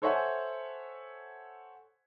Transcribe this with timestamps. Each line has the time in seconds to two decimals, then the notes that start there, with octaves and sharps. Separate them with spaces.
0.02 A4 C5 C#5 E5 F#5 G#5